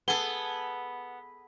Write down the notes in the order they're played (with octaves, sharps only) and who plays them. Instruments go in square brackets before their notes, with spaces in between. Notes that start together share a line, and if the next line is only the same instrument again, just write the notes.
[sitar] B3 [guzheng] G#4 A4 [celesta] G7